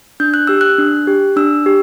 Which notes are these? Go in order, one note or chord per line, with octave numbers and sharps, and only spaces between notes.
D4 G6
F#6
G4 E6
F#6
D4
G4
D4 E6
G4